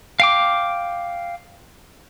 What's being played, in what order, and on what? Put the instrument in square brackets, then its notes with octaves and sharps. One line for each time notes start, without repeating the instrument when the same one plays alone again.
[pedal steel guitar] F5 G5 D6